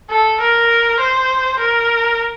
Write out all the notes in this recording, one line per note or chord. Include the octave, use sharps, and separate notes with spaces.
A4
A#4
C5
A#4